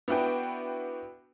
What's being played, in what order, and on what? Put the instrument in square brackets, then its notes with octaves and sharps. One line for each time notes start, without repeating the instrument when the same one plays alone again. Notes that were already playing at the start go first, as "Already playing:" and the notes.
[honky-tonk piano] B3 D4 E4 F#4 B4 G5